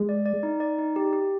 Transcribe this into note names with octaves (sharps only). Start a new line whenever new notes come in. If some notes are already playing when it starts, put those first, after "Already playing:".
Already playing: G#3
D5
D5
D#4
D5
D#4
G4
G4